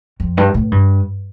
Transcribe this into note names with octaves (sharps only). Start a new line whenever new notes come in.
F2
G2
A2
G2